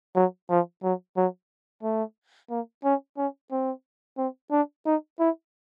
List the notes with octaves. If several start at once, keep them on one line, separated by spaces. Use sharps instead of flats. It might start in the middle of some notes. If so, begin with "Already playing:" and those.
F#3
F3
F#3
F#3
A3
A#3
C#4
C#4
C4
C4
D4
D#4
E4